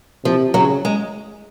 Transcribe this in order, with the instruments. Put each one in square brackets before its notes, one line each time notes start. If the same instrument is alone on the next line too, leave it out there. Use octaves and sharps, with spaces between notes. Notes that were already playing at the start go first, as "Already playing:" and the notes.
[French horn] C3 [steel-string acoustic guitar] F3
[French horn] C#3 [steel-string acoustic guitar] F#3
[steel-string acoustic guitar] G#3